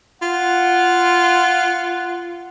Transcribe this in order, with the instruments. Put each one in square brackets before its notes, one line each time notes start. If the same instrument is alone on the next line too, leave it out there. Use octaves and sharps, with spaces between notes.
[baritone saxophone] F4 [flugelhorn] F#5